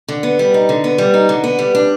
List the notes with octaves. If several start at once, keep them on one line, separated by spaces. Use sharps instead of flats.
D3
B3
G3
D#4
D3
B3
G3
D#4
D3
B3
G3
D4